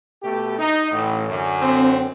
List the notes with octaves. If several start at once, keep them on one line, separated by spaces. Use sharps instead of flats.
B2 A3 G4
D#4
A1 A2
F#2 D3
C4